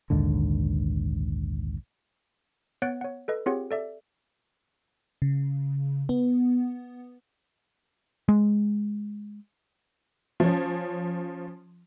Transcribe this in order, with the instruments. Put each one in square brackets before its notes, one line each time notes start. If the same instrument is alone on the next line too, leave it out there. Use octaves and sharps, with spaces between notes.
[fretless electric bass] A#1 D#2 G#2 D3
[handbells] B3 C#5 F#5 F#6 A6 D7
C#5 F#5
A4 B4 D#5
C4 F4 G4 G#4 C#5 F#5
A4 D5 E5
[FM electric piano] C#3
B3
[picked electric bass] G#3
[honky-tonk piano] F3 C#4